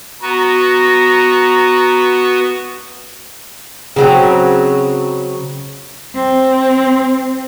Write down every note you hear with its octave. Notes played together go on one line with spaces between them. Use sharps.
B3 F#4 B4 A#5
C#3 F#3 C4
C4